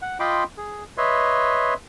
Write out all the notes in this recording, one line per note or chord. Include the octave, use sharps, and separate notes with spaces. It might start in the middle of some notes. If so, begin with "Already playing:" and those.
F#5
F4 D#5 G5 B5 C6 D6
G#4
B4 C#5 D#5 E5 C6